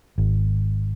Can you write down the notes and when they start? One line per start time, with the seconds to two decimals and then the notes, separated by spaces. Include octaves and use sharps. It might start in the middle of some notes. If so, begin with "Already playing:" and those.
0.18 G#1